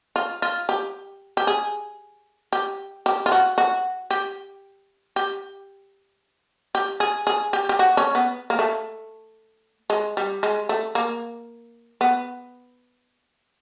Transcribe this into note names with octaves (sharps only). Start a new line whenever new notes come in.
F4
F4
G4
G4
G#4
G4
G4
F4
F#4
F#4
G4
G4
G4
G#4
G#4
G4
G4
F#4
C#4
B3
A#3
A3
G#3
G3
G#3
A3
A#3
B3